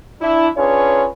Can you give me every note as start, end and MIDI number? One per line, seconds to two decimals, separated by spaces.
0.21 0.47 62
0.21 0.47 64
0.56 1.07 61
0.56 1.07 62
0.56 1.07 65
0.56 1.07 68
0.56 1.07 71
0.56 1.07 73